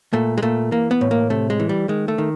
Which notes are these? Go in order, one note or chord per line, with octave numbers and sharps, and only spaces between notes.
A#2 A3
G#3
A#2 A3
E3 A#3
B3
A2
A#3
C3 A3
G#3
E3
G3
D#3 G#3
A3
D#3